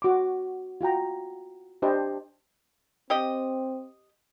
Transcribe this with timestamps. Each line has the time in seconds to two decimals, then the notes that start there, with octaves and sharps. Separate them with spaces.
0.02 F#4 D6
0.81 F4 F#4 G5 A#5
1.82 D4 G4 C5 D#5 A5
3.10 C4 G4 D#5